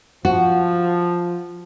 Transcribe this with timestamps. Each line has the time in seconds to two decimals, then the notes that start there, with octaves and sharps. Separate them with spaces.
0.25 F3 F#4